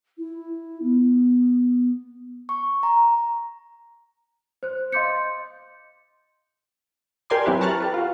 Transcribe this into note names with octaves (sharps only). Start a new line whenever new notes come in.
E4
B3
C#6
A#5
C5 F#6
D#5 F5 C6 D6 G6 C#7
G4 A#4 D5 G#5 C6 D6
F#3 C4 E4 G4 B4
A5 A#5 C#6 F6 F#6 A6
G4 A4 B4
F4 F#4